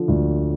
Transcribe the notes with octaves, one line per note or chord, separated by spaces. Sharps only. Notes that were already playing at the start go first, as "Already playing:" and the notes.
Already playing: D3 F3
D2